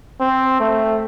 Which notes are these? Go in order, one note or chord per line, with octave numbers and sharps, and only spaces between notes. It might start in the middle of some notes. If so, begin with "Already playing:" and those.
C4
A3